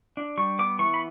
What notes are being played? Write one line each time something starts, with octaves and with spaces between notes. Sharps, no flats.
D4
G3 C#6
B3 D6
E3 C#6
B5